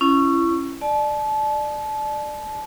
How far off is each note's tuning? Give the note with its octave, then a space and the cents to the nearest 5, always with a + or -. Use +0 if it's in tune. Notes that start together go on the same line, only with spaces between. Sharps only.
C#4 +0 E4 +35
D5 +25 A5 -30